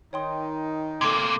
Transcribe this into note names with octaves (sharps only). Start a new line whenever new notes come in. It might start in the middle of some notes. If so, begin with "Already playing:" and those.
D#3 D#4 C#5 G5 C6
C3 A#3 A4 C6 D6 G#6